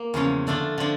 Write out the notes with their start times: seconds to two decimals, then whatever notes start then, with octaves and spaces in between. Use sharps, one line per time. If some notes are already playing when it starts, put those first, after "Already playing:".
Already playing: A#3
0.14 E2 C#3 F3 C#4
0.47 D3 A3 D4 F4
0.78 D3 F3 D4